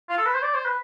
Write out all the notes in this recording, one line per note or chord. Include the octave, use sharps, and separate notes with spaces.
F4
A4
B4
C5
D5
C5
B4